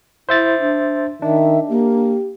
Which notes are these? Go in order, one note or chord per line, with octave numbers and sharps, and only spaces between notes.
E4 C5 E5 A6
D4
D#3 D4 E5
A#3 G4